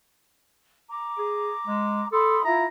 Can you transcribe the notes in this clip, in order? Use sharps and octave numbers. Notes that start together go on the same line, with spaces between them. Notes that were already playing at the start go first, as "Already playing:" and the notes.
A#5 D6
G#4
G#3
A4 B5 C6 D#6
E4 F4 A#5